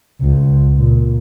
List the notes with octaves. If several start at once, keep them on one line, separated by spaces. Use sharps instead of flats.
C#2
A#2